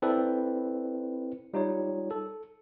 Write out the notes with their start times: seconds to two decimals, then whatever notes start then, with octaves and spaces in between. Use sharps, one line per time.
0.02 C4 E4 A4 B4 D5
1.54 G3 D#4 F4 C#5
2.11 A4